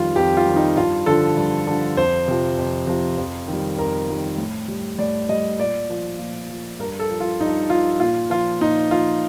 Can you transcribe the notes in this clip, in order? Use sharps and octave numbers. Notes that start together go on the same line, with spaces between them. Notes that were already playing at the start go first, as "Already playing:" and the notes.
Already playing: F2 D#3 G3 F4
F2 G4
F4
D#3 G3
D#4
G2 F4
D3 F3 A4
G2
D3 F3
F2 C5
C3 F3
F2
C3 F3
F2
D#3 G3
F2 A#4
D#3 G3
A2
G3
A2 D5
G3 D#5
A#2 D5
F3
A#2
F3
G2 A#4
A4
F3
F4
G2 D#4
F3 F4
A#2 F4
F3 F4
A#2 D#4
F3 F4